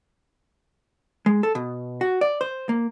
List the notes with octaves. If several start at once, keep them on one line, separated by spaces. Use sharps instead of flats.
G#3
A4
B2
F#4
D5
C5
A#3